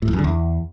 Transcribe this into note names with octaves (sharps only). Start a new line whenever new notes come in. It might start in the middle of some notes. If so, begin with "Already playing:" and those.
A2
F2
F#2
D3
E2